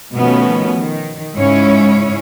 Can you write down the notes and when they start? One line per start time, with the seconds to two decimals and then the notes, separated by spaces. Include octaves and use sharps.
0.14 B2 D#3 F3 A3 B3 C#4
0.76 D#3
1.36 G#2 C#3 G#3 C#4 E4 C#5